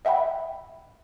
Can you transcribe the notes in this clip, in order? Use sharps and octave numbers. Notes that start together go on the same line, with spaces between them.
D#5 E5 F#5 G5 B5